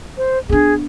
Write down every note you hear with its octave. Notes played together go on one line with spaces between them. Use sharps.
C5
B3 D4 G#4